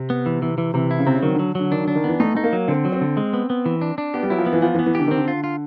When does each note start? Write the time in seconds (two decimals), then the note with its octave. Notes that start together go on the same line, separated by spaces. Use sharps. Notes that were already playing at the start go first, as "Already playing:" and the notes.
Already playing: C3
0.10 B3
0.26 E3
0.42 E3
0.58 E3
0.74 C3 E3
0.91 E4
0.99 C#3
1.06 C3 C4
1.14 C#3
1.22 D#3 F#3
1.35 D3 F#3
1.55 D3 F#3
1.71 D#3 D4
1.84 D3 D4
1.95 D#3
2.04 E3 B3
2.20 A3 D#4
2.35 A3 D#4
2.44 A#3
2.53 F#3
2.68 D3 C4
2.85 F#3
2.92 C4
3.01 D3
3.17 G#3
3.33 B3
3.50 B3
3.66 E3
3.81 D4
3.98 D4
4.14 B3 G4
4.23 G3
4.30 F#3 E4
4.38 F3
4.46 B3
4.53 E3
4.62 F3 B3
4.74 E3
4.79 B3
4.86 E3
4.95 D3 G4
5.07 D#3
5.11 D3 C4
5.28 F4
5.44 F4